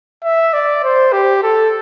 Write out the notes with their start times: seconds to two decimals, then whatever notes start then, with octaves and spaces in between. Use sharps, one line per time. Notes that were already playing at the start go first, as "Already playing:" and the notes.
0.24 E5
0.54 D5
0.84 C5
1.13 G4
1.43 A4